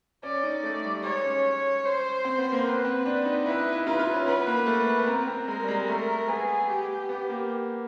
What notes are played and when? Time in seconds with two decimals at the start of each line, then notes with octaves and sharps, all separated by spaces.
0.23 C#4 D5
0.43 D#4
0.63 A3
0.84 G3
1.04 G#3 C#5
1.24 C#4
1.85 C5
2.25 C4
2.38 B3
2.52 A#3
2.65 B3 B4
2.85 C4
3.06 D4
3.25 D#4
3.46 E4 B4
3.59 D#4
3.73 E4
3.86 F4 B4
3.99 F4
4.14 C#4
4.26 B3 B4
4.47 A#3
4.66 A3
4.99 B3
5.07 C4 A#4
5.28 C4
5.48 G#3 A#4
5.63 G3
5.68 G#3
5.88 A3
6.28 B3 G#4
6.69 G4
7.09 B3
7.29 A#3